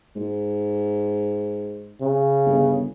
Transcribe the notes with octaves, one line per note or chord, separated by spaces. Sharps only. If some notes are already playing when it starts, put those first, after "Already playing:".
G#2
C#3
G1